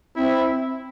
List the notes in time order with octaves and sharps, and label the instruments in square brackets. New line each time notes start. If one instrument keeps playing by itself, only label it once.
[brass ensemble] C4 E4